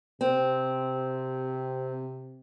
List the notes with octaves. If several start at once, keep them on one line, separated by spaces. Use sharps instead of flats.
C3 C4